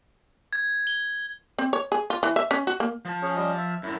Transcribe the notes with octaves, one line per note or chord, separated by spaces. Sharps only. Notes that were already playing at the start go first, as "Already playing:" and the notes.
G#6
G7
C4
C#5
G#4
F4
E3
E5
C#4
F#4
A#3
F3 A5
C#4 G#4 C#5
G3 C#4 D#5
E5
F#2 A2 E4